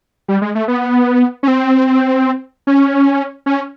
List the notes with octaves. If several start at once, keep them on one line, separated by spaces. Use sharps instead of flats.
G3
G#3
A3
B3
C#4
C4
C#4
C#4